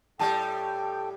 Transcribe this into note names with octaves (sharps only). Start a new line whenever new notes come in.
A2 G3 A4 F#5 G5 A5